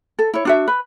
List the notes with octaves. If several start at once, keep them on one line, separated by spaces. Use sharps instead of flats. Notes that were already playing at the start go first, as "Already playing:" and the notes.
A4
E4 C#5
D4 F#4 E5
B4